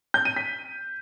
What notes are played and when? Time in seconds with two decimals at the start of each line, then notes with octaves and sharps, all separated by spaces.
0.14 G6
0.25 D#7
0.36 B6